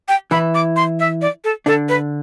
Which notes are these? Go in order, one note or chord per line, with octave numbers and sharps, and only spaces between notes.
G5
E3 E4 B5
D6
C6
E5
D5
A4
D3 D4 A4
B4